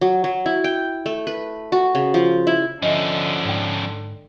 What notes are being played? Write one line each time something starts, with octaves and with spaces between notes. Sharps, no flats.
F#3
F#3
E4
G5
A3
B4
F#4
C#3
F3
E4
D3 F3 C#4 D#5 E5
G#2 D5 G5